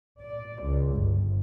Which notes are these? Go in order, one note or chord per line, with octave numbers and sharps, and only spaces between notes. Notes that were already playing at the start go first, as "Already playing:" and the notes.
D5
C#2
G1